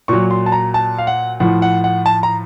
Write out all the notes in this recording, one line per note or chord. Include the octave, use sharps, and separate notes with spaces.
A#2 F#3 C#6
C6
A5
A#5
A5
F5
F#5
A2 F3 F#5
F#5
F#5
A5
A#5